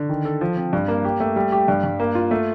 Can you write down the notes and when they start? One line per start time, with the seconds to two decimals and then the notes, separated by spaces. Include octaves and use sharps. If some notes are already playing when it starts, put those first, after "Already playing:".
Already playing: D3
0.09 D#3
0.25 A4
0.41 F3
0.57 C4
0.73 G2
0.88 A#3
1.05 G4
1.20 A3
1.36 G3
1.52 G4
1.68 G2
1.84 G2
2.00 A#3
2.15 F4
2.31 A3